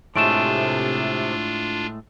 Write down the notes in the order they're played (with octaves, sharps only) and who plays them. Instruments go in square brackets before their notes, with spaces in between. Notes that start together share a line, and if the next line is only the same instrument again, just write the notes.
[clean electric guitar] A2 G#3 A3 [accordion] C3 [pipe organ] D4 F4 [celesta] D7 E7